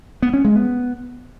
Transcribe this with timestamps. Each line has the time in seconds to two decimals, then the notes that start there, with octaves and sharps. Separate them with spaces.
0.22 B3
0.34 C#4
0.45 G#3
0.56 B3